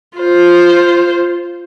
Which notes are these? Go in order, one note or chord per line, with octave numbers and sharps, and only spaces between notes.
F4 C5